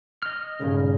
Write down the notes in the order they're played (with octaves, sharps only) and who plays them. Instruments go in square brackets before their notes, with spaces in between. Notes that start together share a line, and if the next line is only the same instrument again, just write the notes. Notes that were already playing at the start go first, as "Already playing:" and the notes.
[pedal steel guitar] D#5 F6
[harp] G#1 G2 A#2 [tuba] C#3